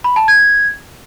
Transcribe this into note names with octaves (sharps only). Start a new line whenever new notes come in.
B5
A5
G#6